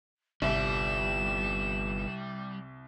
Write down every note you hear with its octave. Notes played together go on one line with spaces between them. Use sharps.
G1 C2 G3 E5 E7